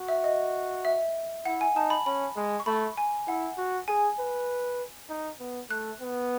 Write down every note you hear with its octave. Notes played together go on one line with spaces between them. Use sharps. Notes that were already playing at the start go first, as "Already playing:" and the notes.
Already playing: F#4
E5
D#5
E5
E4 F#5
G#5
D#4 A5
B5
C#4 B5
G#3
C#6
A3 B5
G#5
E4 F#5
F#4
G#4 G#5
B4
D#4
B3
A3 F#6
B3